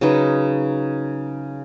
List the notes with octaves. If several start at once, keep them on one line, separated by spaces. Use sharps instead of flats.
C#3 F#3 D#4 B4